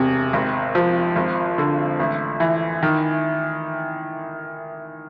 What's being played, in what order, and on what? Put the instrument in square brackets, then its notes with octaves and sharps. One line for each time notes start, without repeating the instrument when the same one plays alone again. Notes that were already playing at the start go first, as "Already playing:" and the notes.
Already playing: [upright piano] E1 C3
G#1
F3
G#1
D3
A1
E3
D#3